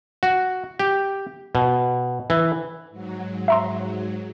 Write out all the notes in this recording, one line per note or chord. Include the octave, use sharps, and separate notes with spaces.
F#4
G4
B2
E3
G#2 F#3
E5 A#5 C6